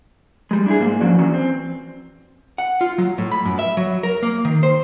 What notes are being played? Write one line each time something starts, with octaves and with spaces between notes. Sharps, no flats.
G3 G#3
D4 E4 G#4
G#2 A#3
F#2 F3 C#4 F#4 D5
E2 E3 F#3 C#4
C4
F#5
F4
F#3
A2
B5
F#2
E5
F#3
A#4
A#3
D#3
C5